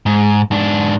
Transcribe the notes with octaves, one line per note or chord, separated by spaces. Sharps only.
G#2
G#2 D4